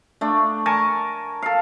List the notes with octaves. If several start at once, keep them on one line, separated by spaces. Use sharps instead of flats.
A3 D4
A#4 G#5 A5 C#6
A4 F5